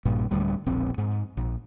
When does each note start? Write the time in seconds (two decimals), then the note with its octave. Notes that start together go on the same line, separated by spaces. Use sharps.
0.05 A#1 G2 A#2
0.31 D1 D2 G3
0.67 E1 A#1 C4
0.98 G#2
1.37 A#1